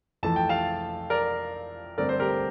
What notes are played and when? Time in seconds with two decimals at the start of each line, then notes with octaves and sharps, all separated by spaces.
0.23 F2 E3 A3 A5
0.36 G5
0.49 F5 A5
1.10 A#4 D5
1.98 G2 D3 A3 C4 A#4 D5
2.09 C5
2.20 G4 A#4